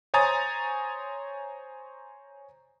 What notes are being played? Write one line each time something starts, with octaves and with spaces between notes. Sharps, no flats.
C5 C#5 G#5 A#5 D#6 A6